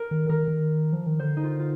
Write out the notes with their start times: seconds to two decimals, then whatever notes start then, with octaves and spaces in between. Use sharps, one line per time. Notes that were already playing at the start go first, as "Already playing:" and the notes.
Already playing: A#4
0.11 D#3
0.29 D#3 A#4
0.48 D#3
0.93 F3
1.07 D#3
1.19 D3 C5
1.37 D#4
1.43 F4
1.59 F4